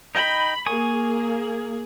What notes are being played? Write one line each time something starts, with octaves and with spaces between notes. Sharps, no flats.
D#4 D#5 G5 B5
A#3 G#4 G#5 C#6 D#6